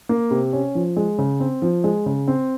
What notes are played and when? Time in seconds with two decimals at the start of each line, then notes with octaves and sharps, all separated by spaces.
0.09 A#3
0.31 C3
0.53 C#4
0.75 F3
0.97 G#3
1.19 C#3
1.40 C4
1.62 F3
1.84 G#3
2.06 C#3
2.28 C4